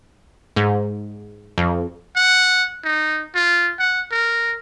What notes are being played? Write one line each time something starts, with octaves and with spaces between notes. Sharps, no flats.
G#2
F2
F#5
D#4
F4
F#5
A#4